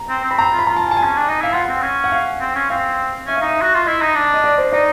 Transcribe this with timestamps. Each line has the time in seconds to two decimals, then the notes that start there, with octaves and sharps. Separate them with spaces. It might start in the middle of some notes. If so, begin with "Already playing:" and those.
Already playing: A#5
0.09 C4
0.24 C4
0.31 B5
0.38 C4 A#5
0.53 F4
0.59 B5
0.67 F4 A#5
0.76 A5
0.87 G#5
0.91 A5
0.97 G#5
1.04 C#4
1.17 D4
1.29 D#4
1.42 E4 F5
1.54 F4 F#5
1.69 C4
1.82 C#4
2.04 F#5
2.12 F5
2.41 C4
2.56 C#4
2.70 C4 F5
3.27 C#4 E5
3.36 F5
3.42 D#4 E5
3.62 F#4
3.74 F4
3.86 E4 D#5
4.02 D#4
4.15 D4
4.34 D#5
4.44 D5
4.58 C5
4.73 D#4 D5